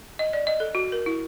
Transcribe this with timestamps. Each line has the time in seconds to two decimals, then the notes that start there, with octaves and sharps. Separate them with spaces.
0.19 D#5
0.33 D5
0.47 D#5
0.60 A4
0.75 F#4
0.92 A#4
1.06 E4